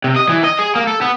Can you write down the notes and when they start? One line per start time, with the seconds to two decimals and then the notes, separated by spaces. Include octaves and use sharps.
0.04 C3
0.16 D#5
0.29 E3
0.44 D#5
0.59 G#4
0.75 A#3
0.87 A4
1.01 B3